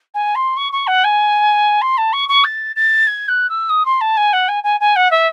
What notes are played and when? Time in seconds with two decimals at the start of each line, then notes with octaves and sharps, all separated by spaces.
0.14 G#5
0.35 C6
0.57 C#6
0.72 C#6
0.87 F#5
1.04 G#5
1.81 C6
1.97 A5
2.13 C#6
2.29 C#6
2.44 A6
2.76 A6
3.07 G#6
3.28 F#6
3.49 E6
3.69 D#6
3.85 C6
4.01 A5
4.17 G#5
4.33 F#5
4.48 G#5
4.63 G#5
4.80 G#5
4.96 F#5
5.11 E5